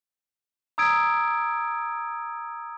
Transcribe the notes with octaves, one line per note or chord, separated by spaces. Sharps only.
A#5 D#6 E6 G#6 D7